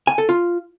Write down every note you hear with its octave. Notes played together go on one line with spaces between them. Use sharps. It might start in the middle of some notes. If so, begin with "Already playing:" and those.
G#5
A4
F4